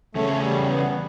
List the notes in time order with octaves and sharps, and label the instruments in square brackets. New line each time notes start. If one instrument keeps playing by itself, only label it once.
[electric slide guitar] E2 C#3 C#4 [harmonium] A3
[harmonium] G3
B3